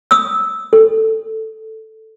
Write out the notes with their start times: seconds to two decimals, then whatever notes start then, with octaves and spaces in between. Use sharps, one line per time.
0.11 D#6 E6
0.73 A4